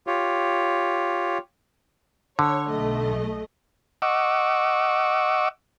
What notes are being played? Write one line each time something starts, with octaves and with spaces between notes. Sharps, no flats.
F4 G4 C#5
D3 C#5
B1 A3 D#5
D#5 F#5 C#6 D6 E6